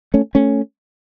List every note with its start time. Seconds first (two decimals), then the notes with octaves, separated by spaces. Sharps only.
0.14 A3 C#4
0.35 A3 C#4